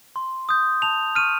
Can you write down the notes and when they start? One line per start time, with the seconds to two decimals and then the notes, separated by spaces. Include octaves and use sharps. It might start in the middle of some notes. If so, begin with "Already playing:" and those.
0.16 C6
0.49 D#6 G6
0.82 A5 F7
1.15 C#6 F6 D#7